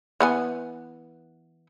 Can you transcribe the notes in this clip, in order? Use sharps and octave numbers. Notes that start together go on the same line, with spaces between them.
E3 B3 G#5